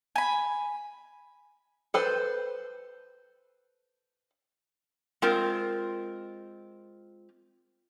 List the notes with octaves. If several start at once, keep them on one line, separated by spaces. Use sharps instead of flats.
G#5 B5
A4 B4 C5
G#3 C4 F4 A#4